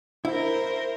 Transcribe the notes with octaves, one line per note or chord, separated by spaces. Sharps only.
E4 A#4 C5